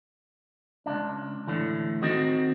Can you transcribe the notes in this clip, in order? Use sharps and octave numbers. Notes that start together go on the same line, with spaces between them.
C#2 F#2 D4
A2 D3 E3
D#3 C4 F#4 D#5